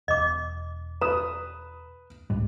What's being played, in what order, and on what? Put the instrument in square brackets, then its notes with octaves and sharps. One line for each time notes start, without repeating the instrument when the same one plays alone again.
[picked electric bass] E1 [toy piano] D#5 D6
[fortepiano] B4 D#6 [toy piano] A#5
[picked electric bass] C2 G#2 G3